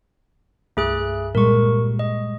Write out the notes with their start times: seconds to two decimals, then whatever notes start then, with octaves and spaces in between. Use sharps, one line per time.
0.77 C2 G2 A3 G#4 F#6
1.35 A#2 G3 G#3 A#4 C#6
1.99 D#5